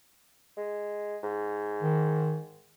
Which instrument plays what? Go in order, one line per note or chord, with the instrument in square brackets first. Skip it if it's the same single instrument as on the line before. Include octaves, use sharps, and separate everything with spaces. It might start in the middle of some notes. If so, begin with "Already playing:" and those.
[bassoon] G#3
G#2
[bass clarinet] D#3